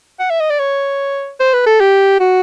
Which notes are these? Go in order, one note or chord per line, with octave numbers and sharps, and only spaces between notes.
F#5
E5
D#5
D5
C#5
C5
B4
A4
G4
F#4